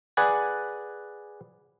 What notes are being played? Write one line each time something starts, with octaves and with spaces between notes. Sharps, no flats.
G#4 B4 D5 F#5 G#5